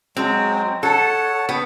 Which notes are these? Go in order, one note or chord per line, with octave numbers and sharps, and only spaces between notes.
F#3 G#3 C4
A4 C#5 F#5 A5
B3 C#5 G5